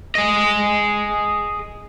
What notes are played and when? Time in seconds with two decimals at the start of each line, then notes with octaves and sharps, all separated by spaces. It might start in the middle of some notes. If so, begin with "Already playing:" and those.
0.15 G#4 D#5